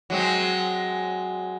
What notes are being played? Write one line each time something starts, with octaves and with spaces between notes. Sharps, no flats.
F#3 G#3 C4